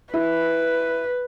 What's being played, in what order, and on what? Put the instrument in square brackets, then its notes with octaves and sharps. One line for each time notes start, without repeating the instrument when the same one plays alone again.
[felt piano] E4 [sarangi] B4